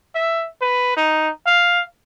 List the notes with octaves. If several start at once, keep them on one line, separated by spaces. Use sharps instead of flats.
E5
B4
D#4
F5